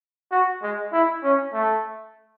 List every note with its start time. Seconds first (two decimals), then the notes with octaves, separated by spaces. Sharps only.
0.31 F#4
0.62 G#3
0.93 E4
1.23 C#4
1.54 A3